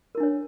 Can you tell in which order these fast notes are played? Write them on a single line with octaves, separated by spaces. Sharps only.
A#4 E4 D4 C#5